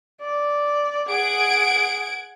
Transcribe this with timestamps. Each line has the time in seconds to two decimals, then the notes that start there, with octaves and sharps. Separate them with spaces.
0.21 D5
1.09 G#4 F#5 G#6 D7